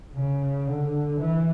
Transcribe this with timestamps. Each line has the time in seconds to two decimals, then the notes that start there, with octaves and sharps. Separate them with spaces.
0.13 C#3
0.67 D3
1.20 E3